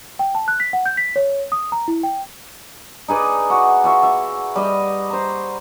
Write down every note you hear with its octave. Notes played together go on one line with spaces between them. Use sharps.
G5
A5
F#6
B6
F#5
G6
B6
C#5
D#6
A#5
E4
G5
D#4 G#4 B4 D5
F#4
F4 F#4 E5
E5
G3 D#5
C5 A#5